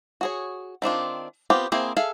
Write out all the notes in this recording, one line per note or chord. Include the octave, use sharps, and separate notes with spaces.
F#4 G#4 C#5
D#3 C4 D4 F4
B3 C4 F4 G4
A#3 C4 E4 G#4 C5
G#4 A4 E5 F5